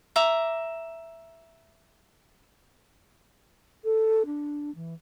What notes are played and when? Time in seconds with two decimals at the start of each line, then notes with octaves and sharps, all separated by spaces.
0.16 E5 A#5 D6
3.84 A4
4.26 D4
4.75 E3